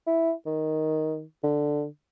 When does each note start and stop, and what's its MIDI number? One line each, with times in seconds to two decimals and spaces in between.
0.07 0.32 64
0.46 1.23 51
1.43 1.85 50